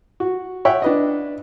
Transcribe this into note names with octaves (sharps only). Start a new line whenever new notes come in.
F#4
C#5 E5 F#5 G5
D4 B4 D#5